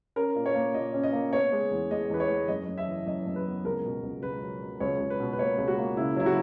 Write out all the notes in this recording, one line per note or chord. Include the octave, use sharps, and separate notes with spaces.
C#4 A#4
A#2
C#5
A#3
A#2 D#5
C#4
D#5
A#3
B3 C#5
G#3
E2
G#3 D#5
E2 B4
C#5
G#3
F#2 D#5
F#2
E5
E3
F#2 D#5
F#2
B4
B3
C#2 A#4
B2
C#2
C#2 B4
F#3
F#3
C#2 C#5
C#2
B4
B2
B4
A#3 C#5
C#2
F#4
A#3
C#3 E4
F#3 E4
F#4